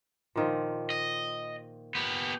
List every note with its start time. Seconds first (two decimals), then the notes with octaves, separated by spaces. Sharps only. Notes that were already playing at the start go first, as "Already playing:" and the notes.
0.36 A#2 D#3 F3
0.90 D#5
1.95 B3 G4